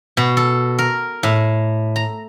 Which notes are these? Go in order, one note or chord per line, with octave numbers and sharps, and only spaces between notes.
B2
A4
A#4
A2
A#5